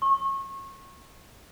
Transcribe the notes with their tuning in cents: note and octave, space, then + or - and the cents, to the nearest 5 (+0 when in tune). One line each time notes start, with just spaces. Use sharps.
C#6 -30